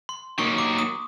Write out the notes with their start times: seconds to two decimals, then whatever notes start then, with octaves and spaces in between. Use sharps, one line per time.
0.09 C6
0.38 F#3 A#3 D#4 C#6
0.58 D6
0.78 D#6